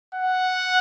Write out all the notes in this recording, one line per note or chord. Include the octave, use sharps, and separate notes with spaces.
F#5